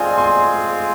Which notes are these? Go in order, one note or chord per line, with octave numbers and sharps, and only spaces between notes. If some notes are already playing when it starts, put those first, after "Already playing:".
Already playing: G#3 C4 F4 D5 G#5 C6
G#5 C6